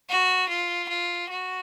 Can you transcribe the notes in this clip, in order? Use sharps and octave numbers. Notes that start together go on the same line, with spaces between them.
F#4
F4
F4
F#4